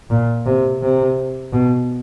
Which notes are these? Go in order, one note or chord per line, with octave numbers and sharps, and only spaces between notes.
A#2
C3
C3
B2